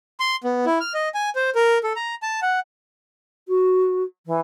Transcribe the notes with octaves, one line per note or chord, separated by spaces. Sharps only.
C6
B3
E4
F6
D#5
G#5
C5
A#4
A4
A#5
A5
F#5
F#4
E3